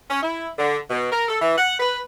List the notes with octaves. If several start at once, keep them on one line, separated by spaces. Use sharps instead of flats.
C#4
E4
D3
B2
A#4
A4
E3
F#5
B4